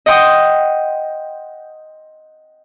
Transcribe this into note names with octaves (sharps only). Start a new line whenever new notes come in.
D#5 F#5 G5 C6 D#6